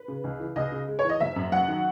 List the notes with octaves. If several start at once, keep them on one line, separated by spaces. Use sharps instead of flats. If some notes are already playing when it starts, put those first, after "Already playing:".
Already playing: B4
C#3
C#2
E3
C#2 D#5
C#3
G#3
C#5
E3 D#5
F#1 E5
F#2
F#3 F#5
D#3